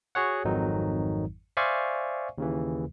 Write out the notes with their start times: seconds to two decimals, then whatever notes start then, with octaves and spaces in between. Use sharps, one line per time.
0.15 F#4 G#4 C#5 F#5
0.45 G#1 F2 G#2 D#3 F#3 D#4
1.57 C5 D5 E5 F5 G#5 C#6
2.38 D#2 C#3 E3